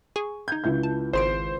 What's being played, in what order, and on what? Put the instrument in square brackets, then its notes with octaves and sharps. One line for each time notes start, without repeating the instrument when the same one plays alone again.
[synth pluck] G#4 G#5 C#6
[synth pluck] D#4 G#6 [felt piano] G6
[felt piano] C#2 E4 G6
[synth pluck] A5
[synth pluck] G#1 G#4 D7 [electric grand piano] C5 C6